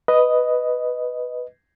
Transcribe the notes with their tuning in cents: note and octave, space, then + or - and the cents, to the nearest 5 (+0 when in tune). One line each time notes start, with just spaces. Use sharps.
B4 +0 D#5 +0